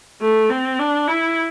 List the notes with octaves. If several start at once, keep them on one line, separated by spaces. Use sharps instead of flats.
A3
C4
D4
E4